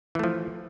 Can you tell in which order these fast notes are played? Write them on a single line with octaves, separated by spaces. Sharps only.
E3 A3 F3